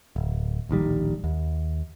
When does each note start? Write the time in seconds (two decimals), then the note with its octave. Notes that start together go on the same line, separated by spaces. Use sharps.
0.16 D1
0.69 D1 A#1 D#3 G3
1.24 D#2